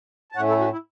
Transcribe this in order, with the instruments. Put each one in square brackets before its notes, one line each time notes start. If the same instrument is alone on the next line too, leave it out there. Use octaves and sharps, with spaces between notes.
[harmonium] A5
A2 A3 C#4 C#5 F#5
E4 A4
F#4
E4